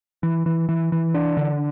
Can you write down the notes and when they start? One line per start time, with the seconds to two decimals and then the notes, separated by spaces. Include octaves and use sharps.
0.23 E3
0.46 E3
0.69 E3
0.92 E3
1.14 D4
1.37 D3